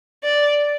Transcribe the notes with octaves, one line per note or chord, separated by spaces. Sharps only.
D5